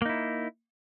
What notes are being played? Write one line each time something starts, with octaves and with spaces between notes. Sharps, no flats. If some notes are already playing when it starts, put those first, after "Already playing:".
A#3 D#4 E4